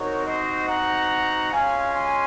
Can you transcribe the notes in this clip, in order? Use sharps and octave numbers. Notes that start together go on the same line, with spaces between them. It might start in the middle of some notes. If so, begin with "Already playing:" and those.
Already playing: C4 D#4 F#4 A#4 C#5
C5 D#5
F#5 A#5
G#3 C#4 F4 F5 G#5
G#5 C6